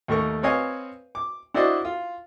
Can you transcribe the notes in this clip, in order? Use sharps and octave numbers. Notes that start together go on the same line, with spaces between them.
D#2 A3 A#4 C#6
C4 B4 C#5 D#5 F5 G#5
D6
D4 E4 F#4 C5 D5 D#5
F4